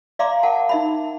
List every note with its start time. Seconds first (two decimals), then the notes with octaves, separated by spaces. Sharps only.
0.19 D5 E5 F5 A#5 C6 D6
0.43 A#4 F5 F#5 A5
0.69 D#4 E5 B5